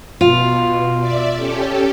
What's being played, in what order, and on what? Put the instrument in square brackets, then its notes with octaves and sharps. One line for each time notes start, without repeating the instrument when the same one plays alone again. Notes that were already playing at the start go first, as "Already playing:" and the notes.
[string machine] B2 [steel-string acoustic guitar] F4
[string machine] D5 E5
C#4 G4 A4